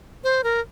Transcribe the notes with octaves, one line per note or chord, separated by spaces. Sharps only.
C5
A#4